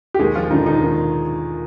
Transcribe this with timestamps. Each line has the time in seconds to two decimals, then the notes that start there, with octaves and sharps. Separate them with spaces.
0.14 G4
0.19 D#2 G#3 G#4
0.35 F3 F4
0.50 D3 D#3 F3 D#4
0.66 D#3 D#4
0.81 D#2